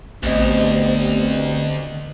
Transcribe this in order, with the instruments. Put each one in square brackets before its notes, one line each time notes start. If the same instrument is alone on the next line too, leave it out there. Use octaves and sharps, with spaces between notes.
[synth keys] A1 D#5 [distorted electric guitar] D2 [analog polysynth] B3 C4 G4